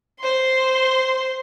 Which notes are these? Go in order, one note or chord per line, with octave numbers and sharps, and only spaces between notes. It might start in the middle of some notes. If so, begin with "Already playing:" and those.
C5 C6